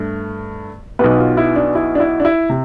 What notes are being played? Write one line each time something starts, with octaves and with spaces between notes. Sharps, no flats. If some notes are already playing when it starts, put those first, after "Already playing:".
Already playing: G2 A3
B1 B2 B3 B4
F4
E4
D4
E4
D4
E4
D4
E4
C3